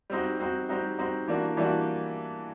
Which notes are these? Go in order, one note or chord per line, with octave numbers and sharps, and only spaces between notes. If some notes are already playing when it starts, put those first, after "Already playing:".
G3 C4 D#4 F#4
G3 C4 D#4 F#4
G3 C4 D#4 F#4
G3 C4 D#4 F#4
E3 G3 A#3 D4 F#4
E3 G3 A#3 D4 F#4